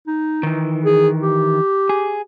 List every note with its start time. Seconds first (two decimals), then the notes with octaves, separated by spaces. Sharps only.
0.07 D#4
0.43 D#3 E3
0.85 G#4
1.21 G4
1.89 G#4